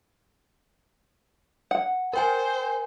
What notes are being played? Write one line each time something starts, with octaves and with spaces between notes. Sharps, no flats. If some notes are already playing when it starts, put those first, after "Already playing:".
F#5
A#4 C5 G5 G#5